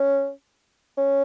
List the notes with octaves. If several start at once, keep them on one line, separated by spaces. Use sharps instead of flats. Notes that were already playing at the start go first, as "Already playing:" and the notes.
Already playing: C#4
C#4